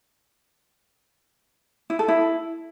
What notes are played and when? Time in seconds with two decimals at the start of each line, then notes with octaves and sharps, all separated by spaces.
1.90 E4
1.99 A4
2.08 E4